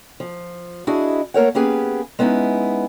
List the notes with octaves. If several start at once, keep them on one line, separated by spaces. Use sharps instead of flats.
F3
D4 E4 F#4 G#4 D#5
A3 A#3 A#4 C#5 F#5
A#3 B3 C#4 G4 G#4 B4
G#3 B3 C#4 D#4 E4